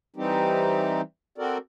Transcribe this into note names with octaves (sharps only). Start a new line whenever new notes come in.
E3 G3 C4 D#4 G4
C4 F#4 A4 A#4 D5